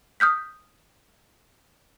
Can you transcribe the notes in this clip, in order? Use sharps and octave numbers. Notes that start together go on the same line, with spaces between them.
D#6 F6 G6 B6